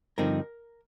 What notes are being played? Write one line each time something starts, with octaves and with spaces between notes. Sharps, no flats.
G2 D3 F3 C4 D#4 A#4